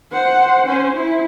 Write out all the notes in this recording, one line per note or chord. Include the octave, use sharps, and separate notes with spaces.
C5 F#5
C#4 C5
E4